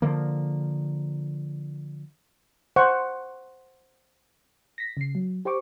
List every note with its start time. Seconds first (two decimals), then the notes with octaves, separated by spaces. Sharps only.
0.02 D3 F3 A#3
2.76 C5 F#5 C#6
4.78 A#6 B6
4.97 C#3 C7
5.15 F#3
5.45 G4 C5 G5 C#6 D6